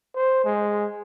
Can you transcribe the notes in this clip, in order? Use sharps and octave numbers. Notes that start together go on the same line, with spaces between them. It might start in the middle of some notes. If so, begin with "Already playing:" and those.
C5
G#3